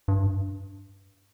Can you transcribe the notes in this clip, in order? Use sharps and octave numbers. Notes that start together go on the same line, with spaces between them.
G2